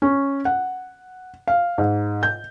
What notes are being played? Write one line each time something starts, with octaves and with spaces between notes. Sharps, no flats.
C#4
F#5
F5
G#2
G6